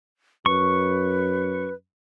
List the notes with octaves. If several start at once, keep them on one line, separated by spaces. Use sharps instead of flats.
F#2 B4 C#6